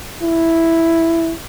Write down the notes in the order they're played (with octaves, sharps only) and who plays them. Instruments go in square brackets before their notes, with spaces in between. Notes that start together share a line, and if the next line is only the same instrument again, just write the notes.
[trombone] E4